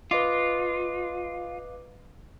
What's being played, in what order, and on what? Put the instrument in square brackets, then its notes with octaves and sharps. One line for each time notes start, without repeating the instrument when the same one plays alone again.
[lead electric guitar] F4 [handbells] B4 D#5 D6